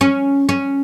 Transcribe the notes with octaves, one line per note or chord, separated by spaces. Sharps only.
C#4
C#4